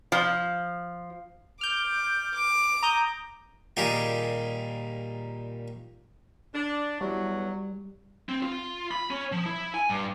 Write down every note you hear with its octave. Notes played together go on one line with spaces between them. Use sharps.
F3
D6 F6 G6
D6
A#5 D#6 G6
A#2 D#3 G3 A#3 G4 G#4
D4
E2 F#3 G3
C4
F4
B5
C#4
F3
E4
G#5
G2